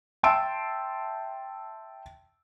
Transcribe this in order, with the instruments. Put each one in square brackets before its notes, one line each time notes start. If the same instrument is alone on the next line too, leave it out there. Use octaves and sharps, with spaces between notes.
[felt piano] E5 G5 A5 C6 E6 D7